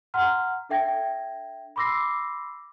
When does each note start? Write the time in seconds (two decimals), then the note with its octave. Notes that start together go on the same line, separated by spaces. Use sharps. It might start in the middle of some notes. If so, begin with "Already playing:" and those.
0.14 F#5 A#5 C6 F6
0.69 D4 A4 E5 G5 G#6 A#6
1.76 B5 C6 D6 E6 A#6 C7